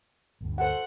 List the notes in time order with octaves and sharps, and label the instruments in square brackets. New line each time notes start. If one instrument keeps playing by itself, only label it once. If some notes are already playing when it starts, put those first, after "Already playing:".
[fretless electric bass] G1 D2 G2
[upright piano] F#4 A4 C5 [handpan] F#5